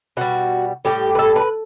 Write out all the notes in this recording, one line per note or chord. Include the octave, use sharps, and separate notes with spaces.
B2 G3 F#4
A2 E3 G3 G4
B4
A4
B4